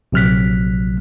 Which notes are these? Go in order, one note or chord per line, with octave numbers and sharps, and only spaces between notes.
A#1 C3 F#3 F6 F#6 B6